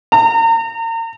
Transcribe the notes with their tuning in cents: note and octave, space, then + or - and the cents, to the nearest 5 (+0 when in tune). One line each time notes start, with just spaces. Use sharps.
A#5 -35